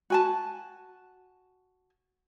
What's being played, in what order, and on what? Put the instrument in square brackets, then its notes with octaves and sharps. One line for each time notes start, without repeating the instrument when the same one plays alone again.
[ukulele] F#4 G#5 A5